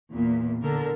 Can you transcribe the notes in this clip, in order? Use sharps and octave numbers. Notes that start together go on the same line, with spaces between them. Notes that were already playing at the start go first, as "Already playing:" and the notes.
E2 A#2
A2 D3 A4 A#4